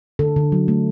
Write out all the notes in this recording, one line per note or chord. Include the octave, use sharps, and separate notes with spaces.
D3 A4
D3
F#3
A3